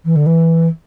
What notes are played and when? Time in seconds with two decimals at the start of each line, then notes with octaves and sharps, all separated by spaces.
0.05 E3
0.16 D3
0.26 E3